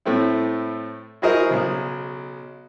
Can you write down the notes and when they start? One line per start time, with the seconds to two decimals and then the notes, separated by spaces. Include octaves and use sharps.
0.05 A2 A3 C4 E4
1.22 E4 F#4 G#4 A#4 C5 D#5
1.50 B1 C#3